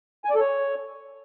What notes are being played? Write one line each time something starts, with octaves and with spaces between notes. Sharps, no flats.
G#5
D5
A4
C#5